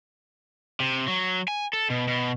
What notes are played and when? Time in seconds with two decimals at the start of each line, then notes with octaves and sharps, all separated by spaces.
0.80 C3
1.08 F#3
1.48 G#5
1.73 A4
1.90 B2
2.08 B2